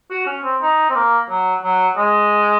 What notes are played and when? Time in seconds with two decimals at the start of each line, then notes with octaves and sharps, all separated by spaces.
0.11 F#4
0.27 C#4
0.44 C4
0.62 D#4
0.90 C4
0.95 A#3
1.30 F#3
1.63 F#3
1.97 G#3